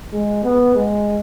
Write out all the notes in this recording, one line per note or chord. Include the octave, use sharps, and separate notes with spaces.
G#3
B3
G#3